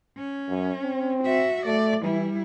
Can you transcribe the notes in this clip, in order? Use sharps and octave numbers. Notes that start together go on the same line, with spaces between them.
C#4
F#2
C4
F#4 E5
A3 D5
E3 G3 E4